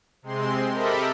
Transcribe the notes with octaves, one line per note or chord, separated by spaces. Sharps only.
C3 G#3 C4 C6
G4 A4 A#4 D#5 E5 B5